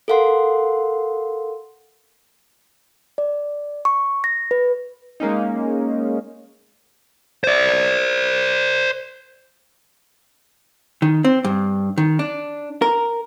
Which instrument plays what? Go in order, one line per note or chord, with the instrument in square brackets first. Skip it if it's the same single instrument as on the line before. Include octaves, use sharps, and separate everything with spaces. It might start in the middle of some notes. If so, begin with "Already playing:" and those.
[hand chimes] A4 A#4 F5 F#5 C6
D5
C#6
A#6
B4
[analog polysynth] G#3 A#3 C#4 D#4
[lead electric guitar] C5 D5
[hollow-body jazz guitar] D#3
C4
G2
D#3
D4
A#4